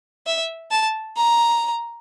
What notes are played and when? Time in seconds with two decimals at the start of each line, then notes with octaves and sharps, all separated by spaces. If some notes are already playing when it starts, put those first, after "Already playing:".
0.27 E5
0.71 A5
1.17 A#5